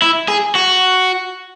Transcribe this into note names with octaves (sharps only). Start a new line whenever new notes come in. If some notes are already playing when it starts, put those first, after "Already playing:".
E4
G#4
F#4